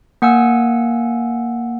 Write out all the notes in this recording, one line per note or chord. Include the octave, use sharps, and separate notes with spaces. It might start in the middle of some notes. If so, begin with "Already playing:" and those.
A#3 F#5 G#5 E6